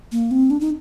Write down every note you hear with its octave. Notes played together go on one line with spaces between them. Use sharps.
A#3
C4
D4
D#4